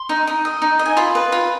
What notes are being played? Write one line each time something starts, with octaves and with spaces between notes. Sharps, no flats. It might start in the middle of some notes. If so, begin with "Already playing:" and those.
Already playing: C6
D#4
D#4
D#5
D#4
D#5
G#5
F4 B5
B4
F4